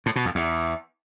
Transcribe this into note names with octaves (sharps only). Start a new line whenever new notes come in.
A2
B2
F2
E2